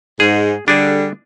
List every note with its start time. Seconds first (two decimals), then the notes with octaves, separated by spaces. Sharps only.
0.20 G#2 G#4
0.68 D3 G3 D4 G#4